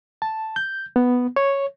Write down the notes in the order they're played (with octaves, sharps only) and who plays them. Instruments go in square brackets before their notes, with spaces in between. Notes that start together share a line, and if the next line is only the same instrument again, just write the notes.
[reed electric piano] A5
G6
B3
C#5